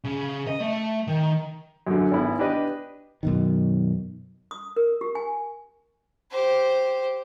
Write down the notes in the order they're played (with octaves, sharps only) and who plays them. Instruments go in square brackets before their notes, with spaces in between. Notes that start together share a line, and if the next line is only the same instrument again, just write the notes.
[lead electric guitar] C#3
D#5
A3
D#3
[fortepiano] F#2 D3
G#1 B3 E4
D4 G4 B4 D#5
[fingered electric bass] F#2 B2 D#3
[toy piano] D#6
A#4
G4
G#5
[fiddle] G4 C5